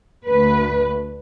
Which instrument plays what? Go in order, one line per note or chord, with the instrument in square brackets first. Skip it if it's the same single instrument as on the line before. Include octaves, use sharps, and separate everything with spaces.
[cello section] D2 B4